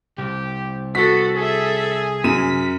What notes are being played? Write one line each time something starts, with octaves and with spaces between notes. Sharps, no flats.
C2 G4
B3 F#4 A4 B6
G#4 A4 E5
F#2 B6 D#7